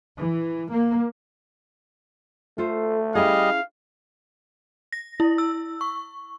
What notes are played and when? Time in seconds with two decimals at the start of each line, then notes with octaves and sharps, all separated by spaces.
0.17 E3
0.71 A#3
2.58 A3 F4 A4 C5
3.15 G3 C#4 E4 G#4 D#5 F5
4.92 A#6
5.20 E4
5.38 E6
5.81 C#6